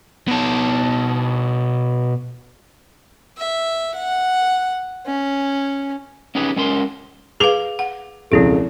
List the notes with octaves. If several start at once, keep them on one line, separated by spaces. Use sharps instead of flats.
B2 A4
E5
F#5
C#4
C#4 D#4 G4 G#4 B4
G#3 C#4 A#4 C6
G#4 B4 F5 D6 F7 G7
F#5
E1 C#2 F3 C4 E4 A4